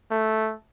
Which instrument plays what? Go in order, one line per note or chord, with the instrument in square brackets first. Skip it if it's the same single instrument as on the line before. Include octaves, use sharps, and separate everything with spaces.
[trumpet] A3